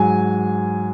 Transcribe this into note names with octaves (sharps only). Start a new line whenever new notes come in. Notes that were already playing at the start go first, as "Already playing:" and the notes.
Already playing: G#2 F#3 G#5